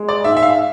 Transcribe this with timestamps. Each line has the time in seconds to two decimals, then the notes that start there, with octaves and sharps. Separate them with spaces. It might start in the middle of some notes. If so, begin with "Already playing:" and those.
Already playing: G#3
0.09 D5
0.24 G#2 E5
0.37 E5
0.43 F5